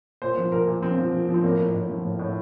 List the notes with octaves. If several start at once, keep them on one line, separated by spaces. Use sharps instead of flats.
A#2 C5
F3
A#2 A#4
A#2
F3 C4
F3
A#2
F3
C4
A2 A#3
A2
A2
F3
A2
A2